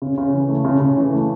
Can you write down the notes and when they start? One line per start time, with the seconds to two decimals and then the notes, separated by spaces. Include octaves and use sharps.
0.02 C#3
0.18 C#3
0.34 E3
0.49 A3
0.65 C#3
0.80 C#3
0.97 E3
1.13 A3